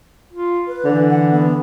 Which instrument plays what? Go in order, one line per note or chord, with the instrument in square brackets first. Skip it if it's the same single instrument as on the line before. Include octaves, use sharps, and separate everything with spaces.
[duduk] F4
[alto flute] B4
[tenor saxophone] D3 [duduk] E3
[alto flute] F#5
B3